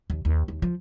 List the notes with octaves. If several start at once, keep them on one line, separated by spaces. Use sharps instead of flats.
D#2
D#2
D#2
F3